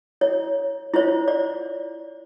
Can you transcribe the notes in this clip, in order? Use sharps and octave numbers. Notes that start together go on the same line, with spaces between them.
E4 C#5
E4 F4 C5 C#5
D5